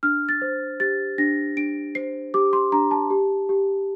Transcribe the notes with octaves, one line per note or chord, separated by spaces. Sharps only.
D4 F6
A6
C5
G4 A6
D4 A#6
D4 D7
C5 C7
G4 D6
C6
D4 A#5
A5
G4
G4